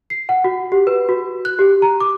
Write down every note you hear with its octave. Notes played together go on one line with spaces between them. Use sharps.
C7
F#5
F#4
G4
B4
F#4
F#6
G4
A#5
D6